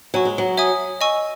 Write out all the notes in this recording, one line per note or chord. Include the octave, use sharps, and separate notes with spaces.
F#3 C#5 G#5 C#6
G#3
F#3
C#5 E5 G#5 D#6
D#5 G#5 C#6 E6